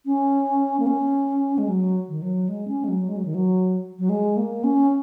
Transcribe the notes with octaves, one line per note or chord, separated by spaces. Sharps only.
C#4
A#3
C#4
G#3
F#3
D#3
F#3
G#3
C#4
G#3
F#3
G#3
F#3
D#3
F#3
F#3
G#3
A#3
C#4